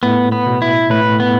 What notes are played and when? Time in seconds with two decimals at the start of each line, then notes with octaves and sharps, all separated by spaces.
0.03 A2 B3
0.32 B3
0.46 B2
0.62 E4
0.90 A2 B4
1.20 B3